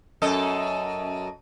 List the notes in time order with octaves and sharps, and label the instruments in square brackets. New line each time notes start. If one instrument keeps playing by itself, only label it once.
[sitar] F#2 A4 D#5